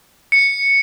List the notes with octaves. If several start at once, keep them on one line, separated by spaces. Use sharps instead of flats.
C#7